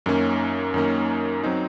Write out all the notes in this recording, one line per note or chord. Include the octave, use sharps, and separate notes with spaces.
F#2 D#3 A#3 C#4
F#2 D#3 A#3 C#4
F#3 C4 D#4